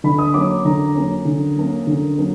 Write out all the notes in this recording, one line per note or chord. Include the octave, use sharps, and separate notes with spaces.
D3 B5
D#6
F#3 A#3 C#4 D6
D3 A#5
F#3 A#3 C#4
D3
F#3 A#3 C#4
D3
F#3 A#3 C#4